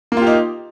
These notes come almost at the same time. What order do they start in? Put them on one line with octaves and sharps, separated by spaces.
A#3 F4 G4 D#4